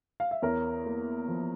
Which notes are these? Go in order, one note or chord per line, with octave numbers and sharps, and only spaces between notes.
F5
E5
E2 A#4 C#5
A#3
F3